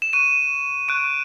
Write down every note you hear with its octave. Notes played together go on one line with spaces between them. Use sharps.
E7
C#6 F#6 D#7
C#6 F#6 D7